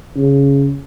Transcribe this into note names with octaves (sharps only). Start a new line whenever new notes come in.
C#3